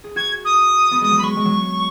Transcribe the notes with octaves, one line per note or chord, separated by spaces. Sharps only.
G#4
F#4 G#6
D#6
B3
G#3 D#6
F#3
B5
G#3 C#6
G#3
F#3